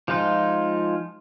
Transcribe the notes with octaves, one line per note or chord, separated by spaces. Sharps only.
F3 G#3 D#4 F4